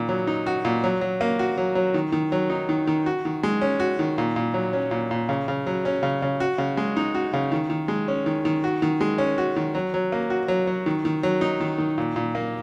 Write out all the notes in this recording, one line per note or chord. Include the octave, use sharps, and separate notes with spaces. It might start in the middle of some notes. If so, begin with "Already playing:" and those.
Already playing: A#2 D#3
F#3
D#4
F#4
A#2
F#3
F#3
A#3
F#4
F#3
F#3
D#3
D#3
F#3
D#4
D#3
D#3
F#4
D#3
G#3
C#4
F#4
D#3
A#2
A#2
F#3
C#4
A#2
A#2
C#3
C#3
F#3
C#4
C#3
C#3
F#4
C#3
G#3
D#4
F#4
C#3
D#3
D#3
G#3
C#4
D#3
D#3
F#4
D#3
G#3
C#4
F#4
D#3
F#3
F#3
A#3
F#4
F#3
F#3
D#3
D#3
F#3
D#4
D#3
D#3
A#2
A#2
A#3